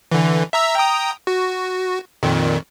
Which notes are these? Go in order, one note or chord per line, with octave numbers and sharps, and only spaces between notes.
D3 E3
E5 A#5 E6
G5 A#5 D#6
F#4
F2 A#2 D#3